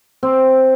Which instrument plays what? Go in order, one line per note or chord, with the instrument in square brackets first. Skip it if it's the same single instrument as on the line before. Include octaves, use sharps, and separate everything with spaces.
[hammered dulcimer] C4